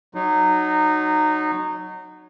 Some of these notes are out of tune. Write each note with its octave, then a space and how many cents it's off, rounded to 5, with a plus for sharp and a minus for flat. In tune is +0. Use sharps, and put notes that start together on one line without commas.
F#3 +0 D#4 -20